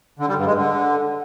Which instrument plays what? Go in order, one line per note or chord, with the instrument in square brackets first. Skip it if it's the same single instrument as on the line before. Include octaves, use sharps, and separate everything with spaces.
[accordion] D3
G3
G2
G#3
D3